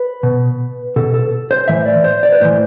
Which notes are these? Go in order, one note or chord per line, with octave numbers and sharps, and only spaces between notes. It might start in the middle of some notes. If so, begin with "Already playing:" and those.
Already playing: B4
B2
B2 A4
A4
C5
A2 E3 E5
D5
C5
D5
B4
A2 E3 C5